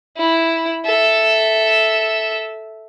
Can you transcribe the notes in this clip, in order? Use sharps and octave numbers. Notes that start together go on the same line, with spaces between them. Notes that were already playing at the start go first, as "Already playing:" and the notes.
E4
A4 E5